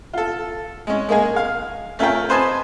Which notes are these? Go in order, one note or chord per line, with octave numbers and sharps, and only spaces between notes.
F4 A4
G#3 C#4
G#3 A#3 G#4
F5
A3 C#4 F4 A#4 G5
B4 C5 D#5 G#5 A5